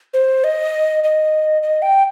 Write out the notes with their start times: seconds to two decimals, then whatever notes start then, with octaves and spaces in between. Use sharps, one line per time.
0.14 C5
0.44 D#5
1.04 D#5
1.63 D#5
1.82 G5